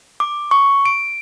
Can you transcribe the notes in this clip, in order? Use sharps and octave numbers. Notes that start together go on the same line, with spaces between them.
D6
C#6
D7